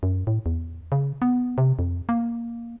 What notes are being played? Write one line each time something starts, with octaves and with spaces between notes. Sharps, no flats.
F#2
A2
E2
C#3
B3
C3
F2
A#3